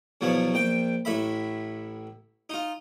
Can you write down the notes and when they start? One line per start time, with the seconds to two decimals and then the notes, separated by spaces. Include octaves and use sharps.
0.21 E2 B2 F3 F#3
0.54 A#1 G5
1.05 A1 A2 E5 B5
2.50 D#4 F4